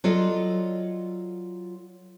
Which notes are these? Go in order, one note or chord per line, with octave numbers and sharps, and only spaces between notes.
F#3 F4 A4 D5 D#5